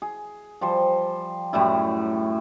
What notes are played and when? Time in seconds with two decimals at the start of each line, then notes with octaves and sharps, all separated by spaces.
0.02 G#4
0.61 F3 G3 C5
1.53 F#2 A2 G3 E4